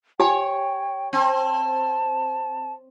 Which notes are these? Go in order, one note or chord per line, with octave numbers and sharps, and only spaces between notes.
G4 C#5 G5 G#5
C4 A5